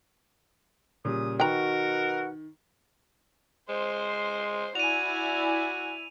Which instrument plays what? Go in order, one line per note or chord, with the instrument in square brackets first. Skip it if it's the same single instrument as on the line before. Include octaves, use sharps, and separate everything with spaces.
[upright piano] A#2 C#3 G3 [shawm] D#6
[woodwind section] B2 F#4 F#5 [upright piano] D#3 [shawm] A#4 [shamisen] G5 A#5
[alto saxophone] G#3 [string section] C5
[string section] E4 D5 G#5 [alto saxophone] F#4 [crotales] D#7 F7